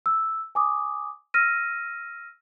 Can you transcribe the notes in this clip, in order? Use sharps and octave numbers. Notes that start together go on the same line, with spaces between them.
E6
G#5 D6 D#6
E6 F6 A#6 D#7